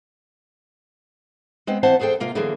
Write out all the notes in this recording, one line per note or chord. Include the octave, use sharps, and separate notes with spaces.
G#3 B3 C4
E3 C4 C5 E5 F#5 A5
E2 G#4 A4 C5 G5
C3 A#3 F4
D3 E3 F#3 A#3 G#4